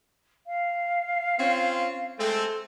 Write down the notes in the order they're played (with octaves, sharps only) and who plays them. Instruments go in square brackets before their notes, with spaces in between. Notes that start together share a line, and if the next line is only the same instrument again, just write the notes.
[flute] F5
[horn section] C4 C#4 F4
[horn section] G#3 A3 C4 [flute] A4